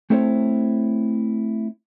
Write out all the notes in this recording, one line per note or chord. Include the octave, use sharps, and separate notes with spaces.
A3 C4 E4 A4 C5 C#5